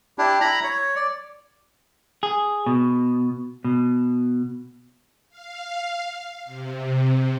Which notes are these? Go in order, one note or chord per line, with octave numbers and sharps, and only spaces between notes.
D4 E4 G4
E4 A#5 B5
C#5
D5
G#4
B2
B2
F5
C3